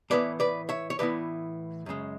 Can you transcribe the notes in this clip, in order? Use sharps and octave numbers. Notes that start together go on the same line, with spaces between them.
A2 E3 B3 E4 B4 D5
B4 D5
C#5 E5
C#5
A2 E3 B3 E4 B4 D5
F#2 C#3 G#3